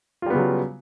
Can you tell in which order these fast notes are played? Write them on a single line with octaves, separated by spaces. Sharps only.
F4 G3 B3 C#3 F#3